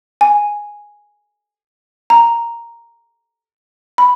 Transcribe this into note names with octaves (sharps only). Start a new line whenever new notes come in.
G#5
A#5
B5